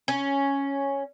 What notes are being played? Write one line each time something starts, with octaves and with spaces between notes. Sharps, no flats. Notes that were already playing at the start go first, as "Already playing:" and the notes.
C#4